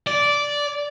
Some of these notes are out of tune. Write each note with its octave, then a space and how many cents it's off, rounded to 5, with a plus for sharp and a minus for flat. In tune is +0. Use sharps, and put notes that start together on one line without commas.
D5 -10